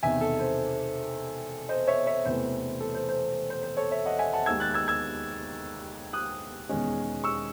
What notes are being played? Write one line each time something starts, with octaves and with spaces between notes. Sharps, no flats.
E1 E2 C3 D#3 E5 G#5
A4
C5
C5 D#5
C#5 E5
C#5 E5
E1 E2 C3 E3 A3 C5
A4
C5
C5
C5
C5
A4 C#5
C#5 E5
D#5 F#5
E5 G#5
F#5 A5
D#2 D#3 G#3 E6 G#6
F#6 A6
E6 G#6
E6 G#6
D#6 F#6
E1 E2 D#3 G#3 C#4
C#6 E6